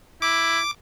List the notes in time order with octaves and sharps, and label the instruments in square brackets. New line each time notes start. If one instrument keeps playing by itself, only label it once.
[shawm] E4 [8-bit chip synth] D6